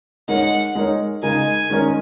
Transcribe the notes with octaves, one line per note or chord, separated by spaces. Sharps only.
G#3 D#4 A#4 C#5 F#5
G#3 D#4 A#4 C#5
C#3 G#3 D#4 A#4 G#5
D#3 G#3 C#4 A#4 D#5